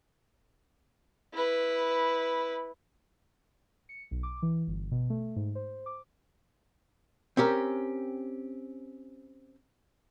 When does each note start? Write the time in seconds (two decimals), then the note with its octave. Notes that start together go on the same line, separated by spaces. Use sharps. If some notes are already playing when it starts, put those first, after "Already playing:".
1.34 E4 B4
3.89 C#7
4.11 B1
4.23 D6
4.42 E3
4.67 G1
4.92 B2
5.10 A3
5.36 G#2
5.55 C5
5.86 D6
7.37 C4 C#4 G4 A#4